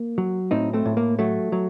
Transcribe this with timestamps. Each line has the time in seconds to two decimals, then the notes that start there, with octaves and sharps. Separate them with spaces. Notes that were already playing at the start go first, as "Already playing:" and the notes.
Already playing: A#3
0.18 F#3
0.51 A2 C4 D#4
0.73 A3 C4
0.85 A2
0.97 A#3
1.19 F#3 A3
1.52 F#3